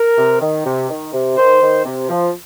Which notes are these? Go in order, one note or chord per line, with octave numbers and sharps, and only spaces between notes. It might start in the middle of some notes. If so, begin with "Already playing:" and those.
Already playing: A#4
C3
D#3
C3
D#3
C3
D#3 C5
D#3
C3
F3